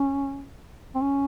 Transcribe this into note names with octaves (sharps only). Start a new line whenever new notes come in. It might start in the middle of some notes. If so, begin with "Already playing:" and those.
Already playing: C#4
C4
C#4